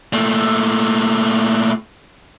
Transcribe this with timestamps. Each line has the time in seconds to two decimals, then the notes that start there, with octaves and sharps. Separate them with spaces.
0.13 A#2 A3